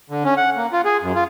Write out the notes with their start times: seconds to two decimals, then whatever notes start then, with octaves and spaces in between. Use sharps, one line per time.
0.10 D3
0.24 C#4
0.37 F#5
0.56 A#3
0.72 F4
0.85 G#4
1.02 F#2
1.15 F4